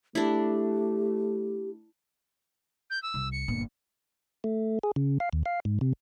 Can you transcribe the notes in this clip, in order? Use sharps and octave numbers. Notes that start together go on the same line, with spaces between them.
A3 D4 E4 G4
G6
E6
C2
C#7
G1 A#2
A3
G#4
C#3
F5
D#2
F5
G#2
C3